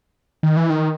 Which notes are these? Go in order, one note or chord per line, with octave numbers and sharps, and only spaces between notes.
D#3
E3
D#3